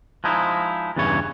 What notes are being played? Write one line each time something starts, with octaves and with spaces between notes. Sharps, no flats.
F3 G#3 D#4 E4
E2 G2 C#3 E3 C#5